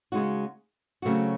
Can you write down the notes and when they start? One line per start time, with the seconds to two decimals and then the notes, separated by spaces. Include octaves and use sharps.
0.12 C#3 G#3 D#4 F#4
1.02 C#3 F#3 A3 C4 F#4